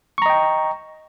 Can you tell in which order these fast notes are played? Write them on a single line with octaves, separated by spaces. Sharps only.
C#6 A#5 D#5 G5